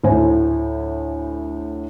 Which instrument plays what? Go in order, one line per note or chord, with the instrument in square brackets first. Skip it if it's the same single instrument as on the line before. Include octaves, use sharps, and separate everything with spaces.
[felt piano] D2 A2 C5 G#5